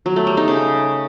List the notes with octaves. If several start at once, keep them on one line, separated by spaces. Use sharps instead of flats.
F#3
A3
G3
D#4
C#3